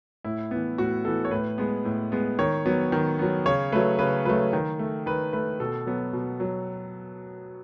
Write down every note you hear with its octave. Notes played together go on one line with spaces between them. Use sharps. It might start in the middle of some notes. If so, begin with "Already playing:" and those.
A2 E4
E3 B3
A2 F#4
E3 B3 A4
C#5
A2 B4
G#3 B3
A2
G#3 B3
D#3 C#5
F#3 B3
D#3
F#3 B3
C#3 C#5
F#3 A3 B4
C#3 B4
F#3 A3 B4
D#3
A3
D#3 B4
A3 B4
B2 A4
F#3 B3
B2
F#3